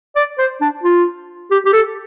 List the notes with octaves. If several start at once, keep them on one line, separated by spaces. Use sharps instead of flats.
D5
C5
D4
F4
G4
G4
A4